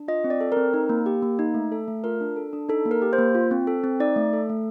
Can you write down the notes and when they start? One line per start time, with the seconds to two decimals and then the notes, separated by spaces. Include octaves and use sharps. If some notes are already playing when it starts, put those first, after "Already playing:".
Already playing: D4
0.08 F4 D#5
0.24 C4
0.30 D5
0.41 A4
0.52 A#4
0.57 C4
0.74 D#4
0.89 A#3
1.06 G4
1.22 A#3
1.39 D#4
1.54 A3
1.72 A4
1.88 A3
2.04 F4 A#4
2.21 D4
2.36 A4
2.53 D4
2.69 D#4 A4
2.86 A#3
2.91 A#4
3.02 G4
3.13 C5
3.18 A#3
3.35 F4
3.51 C4
3.67 A4
3.84 C4
4.00 D#4 D5
4.16 A3
4.33 A4
4.49 A3